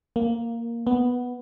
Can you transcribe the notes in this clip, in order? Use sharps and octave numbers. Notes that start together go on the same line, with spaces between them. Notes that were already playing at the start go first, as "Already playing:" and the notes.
A#3
B3